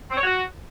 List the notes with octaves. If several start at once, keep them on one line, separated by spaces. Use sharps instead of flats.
C4
C#5
F#4